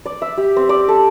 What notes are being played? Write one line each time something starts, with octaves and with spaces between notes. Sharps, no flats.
D5
E5
G4
C4
D5
A4